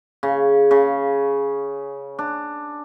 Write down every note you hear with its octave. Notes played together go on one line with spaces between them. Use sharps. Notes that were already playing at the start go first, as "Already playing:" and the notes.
C#3
C#3
D4